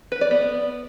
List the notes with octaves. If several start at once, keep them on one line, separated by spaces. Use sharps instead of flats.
B4
D5
B3